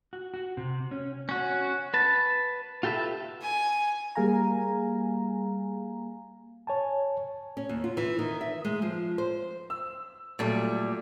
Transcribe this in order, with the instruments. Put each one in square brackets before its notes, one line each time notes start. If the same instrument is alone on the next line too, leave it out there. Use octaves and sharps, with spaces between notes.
[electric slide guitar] F#4
F#4
C3
C#4
[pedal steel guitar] C#4 F#4
B4 A5
F4 G4 A4 B4 E5
[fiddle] G#5
[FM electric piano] G3 A#3 G#4 F5 G#5 A#5
[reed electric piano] C#5 G#5 A5
[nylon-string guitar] C#4
D#2
F4
E3
D#3
E5
G#3
F3
C5
[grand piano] E6
[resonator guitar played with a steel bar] A#2 G3 [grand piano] F#3 A3